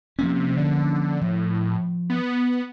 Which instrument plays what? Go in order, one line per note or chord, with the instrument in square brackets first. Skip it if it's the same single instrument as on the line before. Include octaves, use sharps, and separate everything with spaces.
[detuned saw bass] C3 [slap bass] F3 A#3 C#4
[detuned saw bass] D3
[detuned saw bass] A2 [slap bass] F3
[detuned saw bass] B3